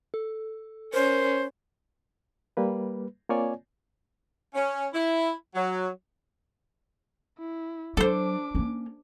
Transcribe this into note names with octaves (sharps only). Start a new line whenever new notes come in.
A4
C#4 A#4 C5
G3 A#3 B4
A#3 C4 F4 C#5 D5 G#5
C#4
E4
F#3
E4
F#3 D4 A4 C5 D6
A#3 C#4